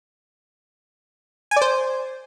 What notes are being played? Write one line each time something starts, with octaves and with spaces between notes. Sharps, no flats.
G#5
D5
C5